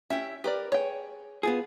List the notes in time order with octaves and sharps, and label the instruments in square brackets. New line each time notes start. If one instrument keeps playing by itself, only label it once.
[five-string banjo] C#4 [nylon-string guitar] E4 G4 E5
[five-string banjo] G4 A#4 D5 [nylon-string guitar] B4
[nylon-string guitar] G#4 [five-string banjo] C#5 G5
[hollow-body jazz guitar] B3 F4 G#4